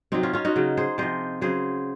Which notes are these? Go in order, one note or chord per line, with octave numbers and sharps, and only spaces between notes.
C3 F#3 C4 D#4
C#4 F4
C#4 F4
D#4 F#4
C#3 F#3
G#4 C5
C3 F3 C5 D#5
C#3 F#3 G#4 C5